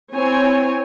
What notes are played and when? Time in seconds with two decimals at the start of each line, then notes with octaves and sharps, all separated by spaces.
0.13 C4 E4 C#5 G#5